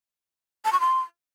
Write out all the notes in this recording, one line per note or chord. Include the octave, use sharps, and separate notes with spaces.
A5
C#6
C6